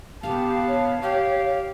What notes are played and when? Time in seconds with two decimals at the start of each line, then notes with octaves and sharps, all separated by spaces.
0.23 E1 B3 G4 F5 A5
0.67 C#5
1.02 G4 F5